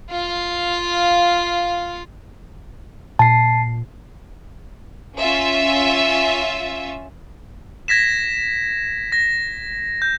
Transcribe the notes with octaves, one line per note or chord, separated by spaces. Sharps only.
F4 F5
A#2 A5 C7
C#4 F4 E5
G#6 A#6 B6 E7
A#6
G6